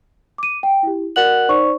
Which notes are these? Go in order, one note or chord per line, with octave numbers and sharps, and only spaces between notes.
D6 D#7
G5
E4 G4
F#4 A#4 D5 F#5 F#6 F#7
D#4 C5 D5 C#6